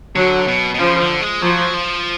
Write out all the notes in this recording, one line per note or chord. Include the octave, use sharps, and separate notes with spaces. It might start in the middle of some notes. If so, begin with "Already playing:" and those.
D3 F#3
B2
B2
C#3 F3
D3
G#3
F3 F#3
F3